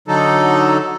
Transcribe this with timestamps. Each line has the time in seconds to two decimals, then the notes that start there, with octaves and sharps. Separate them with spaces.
0.08 D3 F#3 D#4 A4